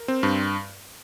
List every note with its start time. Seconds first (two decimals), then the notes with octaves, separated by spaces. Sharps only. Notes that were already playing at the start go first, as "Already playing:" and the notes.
Already playing: A#4
0.08 C4
0.23 G2